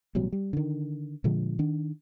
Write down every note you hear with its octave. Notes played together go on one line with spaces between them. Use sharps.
A1 B2 F#3 G3
G3
D3 D#3
A#2 D3 F3 G#3
D#3 D4